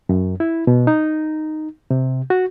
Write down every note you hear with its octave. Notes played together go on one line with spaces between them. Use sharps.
F#2
E4
B2
D#4
C3
F#4